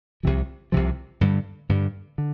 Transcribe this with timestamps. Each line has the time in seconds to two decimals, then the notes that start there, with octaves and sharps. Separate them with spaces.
0.23 C2 C3 F3
0.72 C2 C3 F3
1.21 G2 D3 G3
1.69 G2 D3 G3
2.18 D3